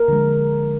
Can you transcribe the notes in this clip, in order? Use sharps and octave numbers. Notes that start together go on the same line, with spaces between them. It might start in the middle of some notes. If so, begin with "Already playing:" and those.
Already playing: A#4
D3 F3 G#3